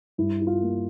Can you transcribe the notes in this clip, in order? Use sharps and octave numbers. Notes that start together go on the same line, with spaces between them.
G2 E4
E4
F4
A#3